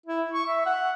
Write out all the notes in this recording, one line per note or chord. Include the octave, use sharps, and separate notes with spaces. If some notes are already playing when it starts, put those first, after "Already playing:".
E4
C#6
E5
F#5